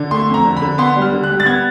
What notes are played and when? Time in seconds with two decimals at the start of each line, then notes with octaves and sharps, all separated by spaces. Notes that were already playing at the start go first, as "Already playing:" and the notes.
Already playing: D3
0.11 A3 C6
0.29 F2
0.34 A#5
0.45 D3
0.56 D3 B5
0.78 B3 C6
0.96 G3
1.02 F6
1.12 D3
1.24 F#6
1.30 G3
1.40 A6
1.45 B3 G#6